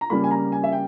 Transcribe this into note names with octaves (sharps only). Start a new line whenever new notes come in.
A#5
C#3 G3 A#3 B5
G#5
A#5
G#5
E5
G5